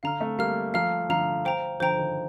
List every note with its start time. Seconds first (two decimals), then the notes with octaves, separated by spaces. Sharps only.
0.03 D3 F5 A#5 F6
0.21 A3 C4
0.38 G3 A#3 F5 A#5 F6
0.74 F3 A3 F5 A#5 F6
1.09 D3 F3 F5 A#5 F6
1.45 C5 G5 A#5
1.80 D3 F3 C5 G5 A#5
1.98 D#3